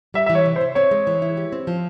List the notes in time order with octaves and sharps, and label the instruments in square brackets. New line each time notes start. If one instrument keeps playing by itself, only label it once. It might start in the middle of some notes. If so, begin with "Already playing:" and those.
[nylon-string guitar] G3 [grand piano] E5
[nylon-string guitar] E3 [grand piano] E5
[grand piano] C#5
[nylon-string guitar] C3
[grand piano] C5
[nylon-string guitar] C3
[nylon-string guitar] C4 [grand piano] C#5
[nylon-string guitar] G#3
E3
E4
G4
C4
F3